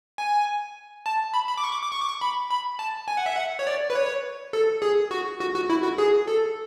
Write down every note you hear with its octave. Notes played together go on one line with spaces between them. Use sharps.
G#5
A5
B5
B5
D6
C#6
D6
D6
C#6
D6
C#6
B5
B5
A5
G#5
F#5
E5
F#5
C#5
D5
B4
C#5
A4
G#4
F#4
F#4
F#4
E4
F#4
G#4
A4